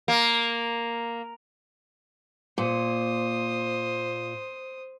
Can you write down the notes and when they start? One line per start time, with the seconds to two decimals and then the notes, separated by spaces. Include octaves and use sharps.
0.08 A#3
2.58 A#2 C5 D#6